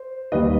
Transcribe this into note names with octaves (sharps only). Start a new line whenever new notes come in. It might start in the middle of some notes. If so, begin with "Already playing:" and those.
Already playing: C5
D#2 D#3 G3 B4 D#5